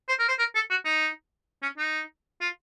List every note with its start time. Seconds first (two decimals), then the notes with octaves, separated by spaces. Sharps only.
0.08 C5
0.19 A#4
0.28 C5
0.39 A#4
0.55 A4
0.70 F#4
0.85 D#4
1.62 C#4
1.78 D#4
2.41 F4